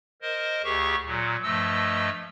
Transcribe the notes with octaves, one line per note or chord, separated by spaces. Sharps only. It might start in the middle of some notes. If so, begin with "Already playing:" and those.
A#4 C5 D#5
D2 G4 G#4 C#6
A#2 F#3
G2 F3 A3 D#5 E6